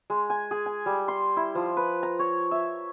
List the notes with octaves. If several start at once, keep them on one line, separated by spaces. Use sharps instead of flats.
G#3
G#5
G#4
G#5
G3
C6
E4
F3
B4
A#5
C#5
E5